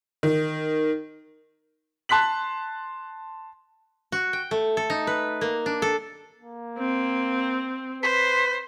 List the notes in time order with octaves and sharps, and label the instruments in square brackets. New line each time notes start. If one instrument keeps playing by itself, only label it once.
[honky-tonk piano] D#3
[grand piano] A5 C6 F#6 B6 F#7
[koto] F#4
G5
A3
A4
D#4
B4
A#3
D4
A4
[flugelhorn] A#3
[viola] C4
[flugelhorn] B4 [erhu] C5 [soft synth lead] B6